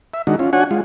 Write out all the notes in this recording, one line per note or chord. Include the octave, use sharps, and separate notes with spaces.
E5
D#3 G#3 D4 D#4 F#4
C#4 F4
D4 F#4 C#5 F#5 G#5
G#3 F4